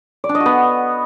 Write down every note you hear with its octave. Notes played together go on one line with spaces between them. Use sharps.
D5
D4
D#5
F#4
B3